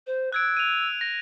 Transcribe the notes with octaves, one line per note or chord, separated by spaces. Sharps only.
C5
E6 F#6 G#6 D7
D#7 F7
A#6